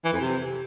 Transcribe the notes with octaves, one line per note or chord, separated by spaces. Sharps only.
E3
F2
C3